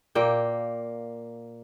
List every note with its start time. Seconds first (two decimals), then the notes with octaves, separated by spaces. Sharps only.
0.15 A#2 A#3 G5